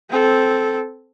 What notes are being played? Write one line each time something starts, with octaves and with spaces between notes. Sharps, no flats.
C4 A4